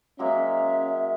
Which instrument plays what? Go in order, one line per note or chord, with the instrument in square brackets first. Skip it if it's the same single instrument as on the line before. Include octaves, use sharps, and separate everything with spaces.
[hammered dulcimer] F#3 G#3 A#3 [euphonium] C#4 [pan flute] E5